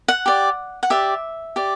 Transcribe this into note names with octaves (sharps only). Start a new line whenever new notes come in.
F#5
G4 D5
F#5
G4 D5 E5
G4 D5